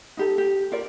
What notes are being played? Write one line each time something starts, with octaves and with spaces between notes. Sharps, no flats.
D#4 G4 A4
G4
F4 A#4 D5